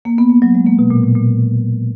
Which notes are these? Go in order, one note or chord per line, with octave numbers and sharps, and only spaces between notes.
A#3
B3
A#3
F#3
G#3
A#3
B2
A#2
A#2
A#2